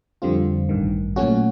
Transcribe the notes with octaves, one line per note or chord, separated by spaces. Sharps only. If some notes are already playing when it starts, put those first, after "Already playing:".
F2 D3 G3 C4 F4
A1 G2 D#3
A#2 F#3 A3 C#4 F#4